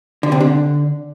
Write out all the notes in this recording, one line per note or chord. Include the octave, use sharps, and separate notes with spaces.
D3
C3
D3